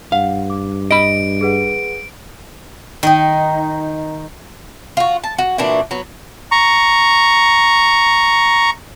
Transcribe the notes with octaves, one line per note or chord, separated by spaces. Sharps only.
G2 F5 F#5
D6
D#5 B5 D7
G#4 B4 F#5
D#3 D#4
F4 F#4
A5
F#4
A#2 E3 D4 F#4
F#3 B3
A#5 C#6